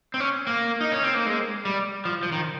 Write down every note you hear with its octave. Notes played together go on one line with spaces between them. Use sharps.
C4
C#4
A#3
D#4
C#4
C4
A#3
G#3
G3
F3
F3
D#3